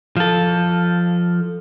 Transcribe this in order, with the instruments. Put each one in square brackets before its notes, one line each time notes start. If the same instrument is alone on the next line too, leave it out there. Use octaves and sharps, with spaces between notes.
[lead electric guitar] F3 A4